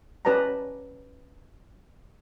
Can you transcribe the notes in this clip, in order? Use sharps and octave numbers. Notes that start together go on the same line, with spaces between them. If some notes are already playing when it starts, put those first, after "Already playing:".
C#4 G4 B4 D5 A5 A#5